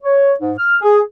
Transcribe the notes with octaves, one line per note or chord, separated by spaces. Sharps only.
C#5
G#2
F6
G#4